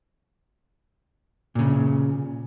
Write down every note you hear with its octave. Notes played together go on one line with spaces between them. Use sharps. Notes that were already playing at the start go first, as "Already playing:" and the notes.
A#2 C#3